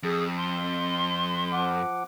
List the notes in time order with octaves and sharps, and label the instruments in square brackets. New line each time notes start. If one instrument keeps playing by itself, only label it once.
[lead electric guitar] F2 [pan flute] G#4
[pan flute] C6
[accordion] F3 F#5 D6